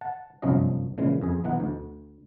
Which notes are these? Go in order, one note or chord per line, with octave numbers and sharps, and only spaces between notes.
F#5 A5
G1 C2 F#2 F3 C#4 D#5
A#2 C#3 E3 G#3
F2 G#4
B1 E3 D#4 F#5
D2